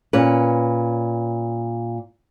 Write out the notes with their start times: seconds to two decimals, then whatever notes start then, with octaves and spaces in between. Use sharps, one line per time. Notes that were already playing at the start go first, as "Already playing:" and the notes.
0.13 A#2 C#4 B4